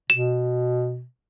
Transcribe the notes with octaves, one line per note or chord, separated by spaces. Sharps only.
B2 E7